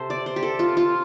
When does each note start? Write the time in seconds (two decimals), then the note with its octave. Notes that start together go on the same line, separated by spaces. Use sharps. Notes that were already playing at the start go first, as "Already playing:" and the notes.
Already playing: C3 A4 C5
0.10 D5
0.26 C5
0.36 G4
0.43 A4
0.59 F4
0.77 F4